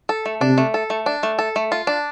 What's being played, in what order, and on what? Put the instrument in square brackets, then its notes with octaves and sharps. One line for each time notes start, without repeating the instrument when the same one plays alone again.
[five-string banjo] A4
A3
[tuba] C3 [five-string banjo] D4
[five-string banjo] A3
A4
A3
D4
A3
A4
A3
F4
D4